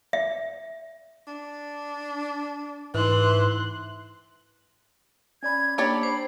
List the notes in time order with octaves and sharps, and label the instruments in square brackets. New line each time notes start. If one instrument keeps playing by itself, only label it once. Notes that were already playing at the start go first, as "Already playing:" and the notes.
[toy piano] E5
[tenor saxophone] D4
[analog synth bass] G#2 [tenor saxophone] E3 [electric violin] C6 F#6
[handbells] C#4 D5 B5 [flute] G#6
[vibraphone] A#3 [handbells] D4 [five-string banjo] G4 C#5 D5 [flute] B5
[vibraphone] C5